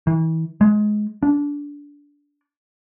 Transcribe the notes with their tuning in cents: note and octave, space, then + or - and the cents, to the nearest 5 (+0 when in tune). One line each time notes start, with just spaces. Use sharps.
E3 -35
G#3 +20
D4 -20